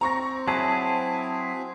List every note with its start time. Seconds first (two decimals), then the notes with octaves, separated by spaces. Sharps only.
0.01 C4 A#5 C#6 A#6
0.48 F#3 E4 G#4 A5